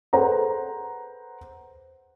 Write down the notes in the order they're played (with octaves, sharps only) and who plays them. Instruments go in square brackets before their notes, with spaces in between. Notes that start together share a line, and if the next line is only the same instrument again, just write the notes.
[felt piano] G#4 A4 B4 C5 F#5 A#5